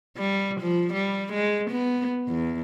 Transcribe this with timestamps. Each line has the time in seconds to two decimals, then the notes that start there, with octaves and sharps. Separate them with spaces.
0.18 G3
0.61 F3
0.94 G3
1.34 G#3
1.71 B3
2.28 E2